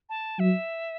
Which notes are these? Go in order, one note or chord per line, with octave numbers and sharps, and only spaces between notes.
A5
F#3 E5